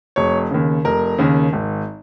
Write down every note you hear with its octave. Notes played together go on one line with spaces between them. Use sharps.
F1 C#5
D#2 C#3
F1 A#4
D#2 C#3
G#1